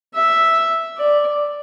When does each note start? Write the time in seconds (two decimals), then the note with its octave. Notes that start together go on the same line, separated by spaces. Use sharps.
0.15 E5
0.97 D5